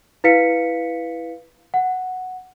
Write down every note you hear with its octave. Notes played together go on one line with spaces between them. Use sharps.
E4 B4 F5 B6 C#7
F#5